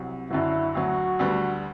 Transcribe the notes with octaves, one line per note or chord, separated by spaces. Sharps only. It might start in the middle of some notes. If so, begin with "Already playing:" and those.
Already playing: C2 C3 F#3
F#2 D3 F#3 E4
D2 D3 F#3 F#4
D2 D3 G3 B3